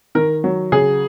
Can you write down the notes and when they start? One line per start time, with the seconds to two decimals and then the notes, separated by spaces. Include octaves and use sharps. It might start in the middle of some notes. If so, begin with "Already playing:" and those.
0.15 D#3 A#4
0.44 F#3
0.72 C#3 G#4